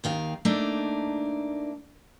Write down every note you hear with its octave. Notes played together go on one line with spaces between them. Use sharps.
D#2 D#3 F5
A3 A#3 D4 D#4